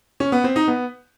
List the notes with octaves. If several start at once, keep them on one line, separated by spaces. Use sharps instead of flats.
C#4
B3
C4
D#4
B3